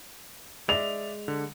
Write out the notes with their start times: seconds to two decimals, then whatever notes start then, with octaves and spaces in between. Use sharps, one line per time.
0.69 G#3 D5 E5 F7
1.28 D3